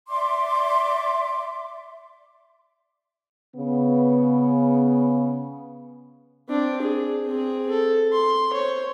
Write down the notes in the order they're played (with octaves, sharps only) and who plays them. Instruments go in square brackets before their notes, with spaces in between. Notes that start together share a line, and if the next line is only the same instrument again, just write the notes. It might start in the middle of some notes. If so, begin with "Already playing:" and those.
[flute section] D5 E5 C6 D6
[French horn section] C#3 B3
[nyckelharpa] C4 D4
G#4
C4 G#4
A4
C6
C5 C#5